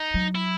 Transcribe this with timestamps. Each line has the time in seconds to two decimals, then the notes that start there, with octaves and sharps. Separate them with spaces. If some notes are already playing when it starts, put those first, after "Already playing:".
Already playing: D#4
0.14 F#3
0.35 E4